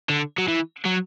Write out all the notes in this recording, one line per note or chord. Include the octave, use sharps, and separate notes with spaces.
D3
F#3
E3
F#3